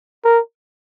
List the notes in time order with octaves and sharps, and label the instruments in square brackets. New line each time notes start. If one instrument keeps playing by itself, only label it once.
[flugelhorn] A#4